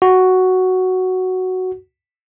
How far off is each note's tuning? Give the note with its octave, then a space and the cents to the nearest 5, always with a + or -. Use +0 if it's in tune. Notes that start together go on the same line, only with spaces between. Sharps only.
F#4 +5